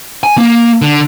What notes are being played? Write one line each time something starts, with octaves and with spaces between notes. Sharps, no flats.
G#5
A#3
D3